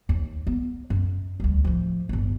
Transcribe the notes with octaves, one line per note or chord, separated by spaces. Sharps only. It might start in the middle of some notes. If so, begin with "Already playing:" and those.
D#2
B3
F#2
D2 G3
A2 F3
G1 D#2